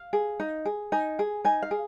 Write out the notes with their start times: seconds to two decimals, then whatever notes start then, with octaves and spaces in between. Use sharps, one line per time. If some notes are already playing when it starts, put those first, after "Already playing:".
Already playing: F5
0.13 G#4
0.40 D#4
0.65 G#4
0.92 D#4 G#5
1.19 G#4
1.44 D#4 G#5
1.62 F5
1.71 G#4